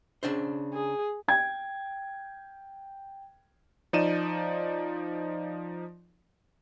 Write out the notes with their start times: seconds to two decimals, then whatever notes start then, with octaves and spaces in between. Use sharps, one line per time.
0.23 C#3 D4 C5
0.73 G#4
1.28 G5 G#6
3.93 F3 D#4 D5 D#7 E7